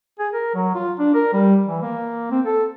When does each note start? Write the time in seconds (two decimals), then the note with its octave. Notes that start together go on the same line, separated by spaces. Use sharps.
0.19 G#4
0.33 A#4
0.54 F#3
0.75 F4
0.99 D4
1.14 A#4
1.33 G3
1.67 E3
1.82 A#3
2.31 C4
2.46 A4